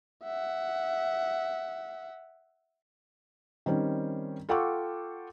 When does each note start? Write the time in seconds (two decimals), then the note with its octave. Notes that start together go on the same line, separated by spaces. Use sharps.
0.24 E5 F#5
3.66 D#3 G3 C4 C#4
4.49 F4 A4 F#5 G5 C#6 D6